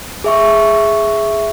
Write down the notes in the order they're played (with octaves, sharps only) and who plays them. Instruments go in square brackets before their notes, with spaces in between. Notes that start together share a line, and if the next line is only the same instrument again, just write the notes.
[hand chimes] G#4 E5 C#6